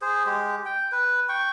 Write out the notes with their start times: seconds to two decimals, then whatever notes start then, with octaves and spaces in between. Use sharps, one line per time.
0.01 G#4 C5
0.26 G#3 G4
0.65 G5
0.92 B4
1.29 G5 C#6